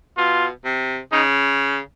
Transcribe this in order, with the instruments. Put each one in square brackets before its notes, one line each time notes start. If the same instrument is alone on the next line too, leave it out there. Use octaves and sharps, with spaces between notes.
[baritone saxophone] B2 [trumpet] F4
[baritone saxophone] C3
[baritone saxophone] C#3 [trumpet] D#4